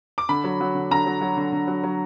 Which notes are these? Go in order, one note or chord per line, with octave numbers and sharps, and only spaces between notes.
D6
D3 B5
F#3
F#3
D3
D3 A#5
F#3
F#3
D3
D3
F#3
F#3